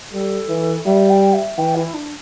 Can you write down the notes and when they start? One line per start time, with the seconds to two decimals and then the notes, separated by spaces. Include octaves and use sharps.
0.12 G3 A4
0.49 E3
0.86 G3 E5
1.10 G5
1.34 E5
1.58 E3 G5
1.76 E4
1.94 D4